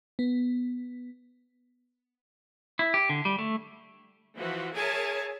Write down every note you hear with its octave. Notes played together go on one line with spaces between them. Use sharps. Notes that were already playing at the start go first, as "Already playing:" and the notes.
B3
E4
G4
D3
G3
A3
E3 F3 F#4
G#4 A#4 C#5 E5 G#5 A5